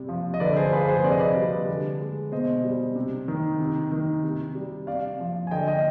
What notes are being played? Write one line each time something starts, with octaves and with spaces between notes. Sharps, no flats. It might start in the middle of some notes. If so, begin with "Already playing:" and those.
Already playing: C3 G3
F3
D#5
D3 B4 D5
G#4 C5
F3 B4
G#4 C5
C3 D5
D#5
B4 D5
G3
D3
G#3
B2 C5 D#5
G3
C3
D#3
C3
D#3
C3
G3
C3 D5 F5
F3
G#5
D3 D#5 G5
D#5 G5